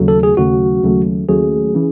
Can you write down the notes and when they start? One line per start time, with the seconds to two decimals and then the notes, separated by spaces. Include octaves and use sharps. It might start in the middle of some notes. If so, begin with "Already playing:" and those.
Already playing: D#2 C#3 F#3 A3
0.08 A4
0.23 G#4
0.37 D#2 C#3 F#3 A3 F#4
0.83 D#2 C#3 F#3 A3
1.29 D#2 C#3 F#3 A3 G#4
1.75 C#3 E3